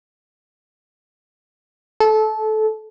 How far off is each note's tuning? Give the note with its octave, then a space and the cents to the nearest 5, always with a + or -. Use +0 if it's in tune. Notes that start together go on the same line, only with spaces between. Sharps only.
A4 -20